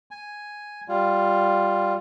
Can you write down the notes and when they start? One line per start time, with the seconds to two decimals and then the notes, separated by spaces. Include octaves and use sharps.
0.11 G#5
0.88 G3 F4